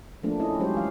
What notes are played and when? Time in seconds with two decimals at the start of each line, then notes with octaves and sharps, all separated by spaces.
0.23 F3 A3 A#3 D4
0.39 A3 C#4 E4 D#5
0.59 F#3 G#3 C#4 G4 C5
0.75 E3 F5